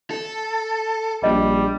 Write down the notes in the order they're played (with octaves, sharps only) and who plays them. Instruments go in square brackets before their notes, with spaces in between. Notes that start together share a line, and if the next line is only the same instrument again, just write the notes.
[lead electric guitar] A4
[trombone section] A#1 [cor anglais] G3 [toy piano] D#5